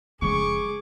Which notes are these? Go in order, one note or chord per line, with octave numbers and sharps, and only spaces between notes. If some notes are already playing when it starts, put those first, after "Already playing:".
F1 C#3 F3 G#3 G#4 C#6 D6